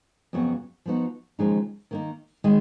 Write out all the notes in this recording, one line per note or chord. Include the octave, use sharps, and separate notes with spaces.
F2 C#3 F#3 B3 F#4
F3 B3 D#4 F#4
D#2 C#3 F3 G#3 D#4
D#3 A#3 D#4
D#3 G#3 D#4